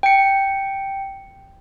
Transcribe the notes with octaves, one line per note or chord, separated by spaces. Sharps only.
G5 C#7